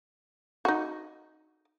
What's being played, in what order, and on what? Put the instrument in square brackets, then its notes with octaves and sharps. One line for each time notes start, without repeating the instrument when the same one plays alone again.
[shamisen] D#4 F#4